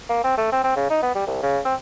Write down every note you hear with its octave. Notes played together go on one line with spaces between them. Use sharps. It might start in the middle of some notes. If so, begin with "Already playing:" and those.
A#3
C4
A3
C4
C4
C#3
D#4
B3
G3
C2
C#3
C4